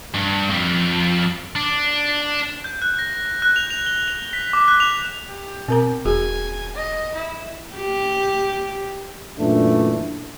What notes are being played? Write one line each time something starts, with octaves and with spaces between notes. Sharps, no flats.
G2
F2
D4
G6
F#6
A#6
F#6
F7
F7
G7
F7
B6
D6
F#6
F7
G4
B2 C4 A#4 A#5
E1 F#4 G#4 G#5
D#5
E4
G4
F#2 A#2 E3 A3 D4